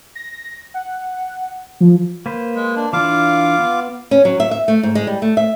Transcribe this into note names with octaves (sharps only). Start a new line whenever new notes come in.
A#6
F#5
F3
A#3 B4 C5
G#3
D4
E3 D4 F4 F5 D6
B3
C#4
F#3
E5
E5
A3
G#2
G#3
G3
A3
E5